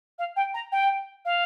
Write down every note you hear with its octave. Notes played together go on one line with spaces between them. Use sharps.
F5
G5
A#5
G5
F5